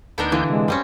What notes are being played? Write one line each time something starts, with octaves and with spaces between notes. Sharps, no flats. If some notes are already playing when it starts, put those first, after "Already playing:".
D2 B3 D4 D#4 A#4 G6
D3 E3 A#3
C3 G#3
F#2 G3 C4 C#4